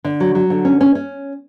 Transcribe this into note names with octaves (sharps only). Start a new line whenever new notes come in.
D3
F#3
F#3
D3
C#4
C#4
C#4